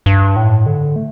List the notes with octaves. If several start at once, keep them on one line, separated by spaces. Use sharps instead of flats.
G2
A2
D3
A3